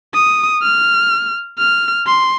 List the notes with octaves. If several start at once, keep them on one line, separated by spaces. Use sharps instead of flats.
D#6
F6
F6
C6